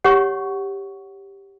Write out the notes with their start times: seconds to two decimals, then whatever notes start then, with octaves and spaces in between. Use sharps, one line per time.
0.04 G4 C#5 F#5 C#6